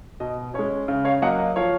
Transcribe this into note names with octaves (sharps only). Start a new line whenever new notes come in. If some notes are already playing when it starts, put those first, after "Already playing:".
B2 D#5
G#3 C#4 C#5
C#3
C#5 F5
F#3 A#3 D#5 F#5
D#5
F3 C#5 F5